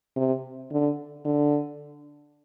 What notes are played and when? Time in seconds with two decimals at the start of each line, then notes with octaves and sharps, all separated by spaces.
0.16 C3
0.71 D3
1.25 D3